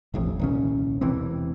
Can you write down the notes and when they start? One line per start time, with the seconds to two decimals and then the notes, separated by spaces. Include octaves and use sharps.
0.14 E1 A1 F2
0.39 D#1 C2 C#4
1.01 E1 C3 E3 C4